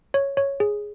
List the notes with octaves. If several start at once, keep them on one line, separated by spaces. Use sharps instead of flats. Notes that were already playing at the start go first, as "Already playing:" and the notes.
C#5
C#5
G#4